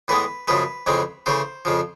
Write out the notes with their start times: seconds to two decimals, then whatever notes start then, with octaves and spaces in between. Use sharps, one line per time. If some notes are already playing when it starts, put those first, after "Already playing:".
0.08 A2 E3 G#3 B3 B4
0.48 F#2 C#3 F3 G#3 B4
0.86 F2 C#3 E3 G#3 C4
1.26 C#3 E3 A3 C5
1.65 F2 C#3 F3